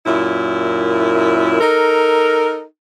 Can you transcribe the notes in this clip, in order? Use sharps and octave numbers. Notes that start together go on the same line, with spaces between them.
F#2 A#2 E4
D#4 A4 A#4